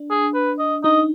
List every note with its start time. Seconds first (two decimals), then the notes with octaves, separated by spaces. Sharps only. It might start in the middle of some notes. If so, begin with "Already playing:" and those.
Already playing: D4
0.10 G#4
0.34 B4
0.59 D#5
0.84 D#4 D#5